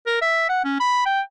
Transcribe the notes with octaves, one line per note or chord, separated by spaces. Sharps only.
A#4
E5
F#5
C#4
B5
G5